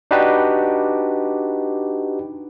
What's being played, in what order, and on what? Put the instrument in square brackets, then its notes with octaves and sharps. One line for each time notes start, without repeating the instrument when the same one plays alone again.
[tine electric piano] D4 D#4 F#4 G4 B4 D5